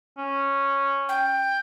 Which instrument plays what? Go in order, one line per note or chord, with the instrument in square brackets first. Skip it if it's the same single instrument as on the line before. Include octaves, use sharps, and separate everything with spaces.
[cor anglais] C#4
[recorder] G5